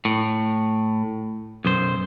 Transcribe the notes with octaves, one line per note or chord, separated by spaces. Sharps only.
A2
B1 F#2 C5